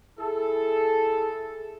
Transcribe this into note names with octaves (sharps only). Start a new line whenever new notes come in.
E4 G#4 A4